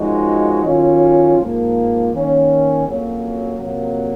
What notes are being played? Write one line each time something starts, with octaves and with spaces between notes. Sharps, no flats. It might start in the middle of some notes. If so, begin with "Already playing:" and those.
Already playing: F#2 F3 G#3 D#4 F#4
D#3 F#3 C#4 F4
G#2 F3 A#3
D#3 A#3 C#4
F2 C#3 F#3 A#3 C#4
F2 C3 F#3 A#3